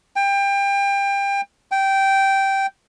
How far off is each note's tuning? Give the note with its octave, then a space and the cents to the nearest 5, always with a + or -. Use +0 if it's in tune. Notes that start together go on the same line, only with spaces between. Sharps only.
G5 +25
G5 -10